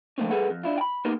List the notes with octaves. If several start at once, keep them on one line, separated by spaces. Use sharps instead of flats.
D3 F3 A3 A#3 C4 C#4
G3 G#4 A4 B4 F#5
F2
D4 E4 F4
G5 B5
A#3 B3 D#4 G4 A#4